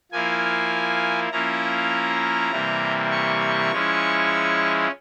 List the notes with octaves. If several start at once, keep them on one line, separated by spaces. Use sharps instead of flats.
F3 A#3 E4 G#5
F3 A#3 C#4 E4 A#5
C3 E3 G3 A#3
C#6
F3 G#3 C#4 E4